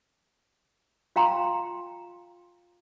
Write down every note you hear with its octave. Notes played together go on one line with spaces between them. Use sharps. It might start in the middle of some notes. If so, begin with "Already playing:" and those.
F4 F5 G5 A#5 C6